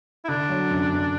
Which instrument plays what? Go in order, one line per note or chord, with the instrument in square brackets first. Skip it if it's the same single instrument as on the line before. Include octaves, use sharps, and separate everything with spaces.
[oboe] E4
[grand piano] D3 [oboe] D4
[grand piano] F#3
F#2
F#2